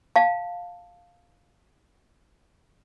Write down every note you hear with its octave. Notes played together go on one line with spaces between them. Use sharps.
F5 A5